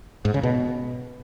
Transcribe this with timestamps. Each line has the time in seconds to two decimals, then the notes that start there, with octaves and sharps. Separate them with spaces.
0.25 G#2
0.34 C#3
0.43 B2